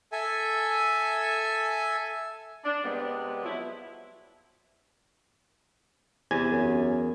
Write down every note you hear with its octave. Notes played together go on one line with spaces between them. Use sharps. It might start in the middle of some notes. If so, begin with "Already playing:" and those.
A4 E5 G#5
D4
C3 G3 G#3 B3
F3 F#3 E4
E2 C3 G#5
F#2